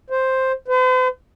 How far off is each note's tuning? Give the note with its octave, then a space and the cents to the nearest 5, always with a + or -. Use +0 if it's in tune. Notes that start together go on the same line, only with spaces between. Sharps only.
C5 +5
C5 -45